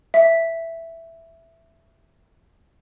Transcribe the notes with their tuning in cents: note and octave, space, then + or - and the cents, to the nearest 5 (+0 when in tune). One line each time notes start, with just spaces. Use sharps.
E5 +5